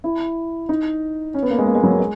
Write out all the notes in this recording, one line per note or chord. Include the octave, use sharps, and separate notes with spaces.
E4
D#4
C#4
B3
A#3
G#3
A#3
G#3
F#3
A#3
G#3